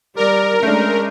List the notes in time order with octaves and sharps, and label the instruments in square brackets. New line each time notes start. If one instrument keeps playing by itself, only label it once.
[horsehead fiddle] G3 D5 [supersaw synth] A#4
[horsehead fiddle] G#3 C#4 [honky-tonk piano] A3 D4